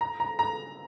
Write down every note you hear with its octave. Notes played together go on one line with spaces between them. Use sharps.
A#5
A#5
A#5